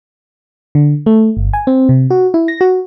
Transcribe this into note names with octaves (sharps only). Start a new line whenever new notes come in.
D3
A3
G1
G#5
C4
C3
F#4
E4
A#6
F#4